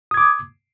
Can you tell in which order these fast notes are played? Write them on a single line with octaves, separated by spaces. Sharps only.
D#6 G#6 D6